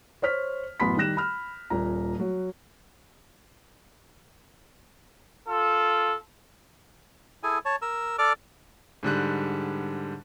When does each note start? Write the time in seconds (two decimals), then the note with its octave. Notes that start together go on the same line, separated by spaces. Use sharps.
0.22 C5 C#5 F6 B6
0.80 A1 F#2 B3 B5 C6 B6
0.96 D#3 G3 G4 F#6 A#6 E7
1.17 B5 F6
1.70 D#1 A#2 A#5
2.20 F#3
5.48 F4 A4
7.43 E4 G#4 A4 G#5
7.65 C#5 A5
7.82 A#4 E6
8.19 A4 D5 D6 F6
9.03 G#2 D3 G3 F#6